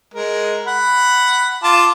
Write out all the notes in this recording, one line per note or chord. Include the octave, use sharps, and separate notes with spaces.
G#3 A#4
F#5 B5
F4 A5 D6